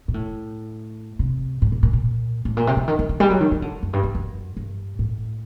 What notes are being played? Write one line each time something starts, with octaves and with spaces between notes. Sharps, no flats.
A#2
A2
C3
A2
A#2
A#2
A#2
A2
A#2
C3
D3
D#3
D#3
D3
G3
F#3
D#3
D#3
D3
F#2
G2
G2
F#2
G2
A2